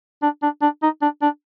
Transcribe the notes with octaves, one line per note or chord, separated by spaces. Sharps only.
D4
D4
D4
D#4
D4
D4